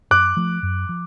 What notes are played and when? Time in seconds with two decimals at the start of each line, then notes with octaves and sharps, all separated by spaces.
0.10 F#2 D6 F#6
0.37 F3 A3
0.63 F#2
0.89 F3